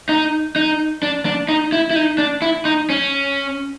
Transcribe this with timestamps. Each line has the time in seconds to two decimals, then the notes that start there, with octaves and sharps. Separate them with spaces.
0.09 D#4
0.56 D#4
1.03 D4
1.25 D4
1.49 D#4
1.72 E4
1.91 E4
1.96 D#4
2.18 D4
2.42 E4
2.65 D#4
2.90 C#4